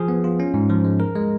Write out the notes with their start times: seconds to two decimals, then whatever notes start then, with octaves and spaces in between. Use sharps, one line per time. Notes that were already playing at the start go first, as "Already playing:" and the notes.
Already playing: F3 G#4
0.08 B3
0.24 F4
0.40 C#4
0.54 G#2
0.70 F3
0.85 G#3
1.00 A#4
1.16 G#3